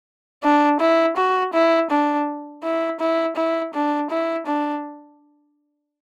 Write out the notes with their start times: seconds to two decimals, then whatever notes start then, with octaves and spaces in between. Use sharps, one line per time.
0.44 D4
0.80 E4
1.17 F#4
1.54 E4
1.91 D4
2.63 E4
3.00 E4
3.36 E4
3.74 D4
4.10 E4
4.47 D4